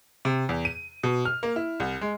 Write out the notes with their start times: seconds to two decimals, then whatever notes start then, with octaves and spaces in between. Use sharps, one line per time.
0.25 C3
0.49 E2
0.65 D#7
1.03 B2
1.25 F6
1.43 A#3
1.56 E4
1.80 C2
2.01 G#3